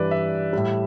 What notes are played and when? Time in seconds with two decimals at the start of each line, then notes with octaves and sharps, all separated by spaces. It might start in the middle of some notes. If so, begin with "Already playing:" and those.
Already playing: G2 E3 G3 B4 D5
0.11 E5
0.53 A2 G3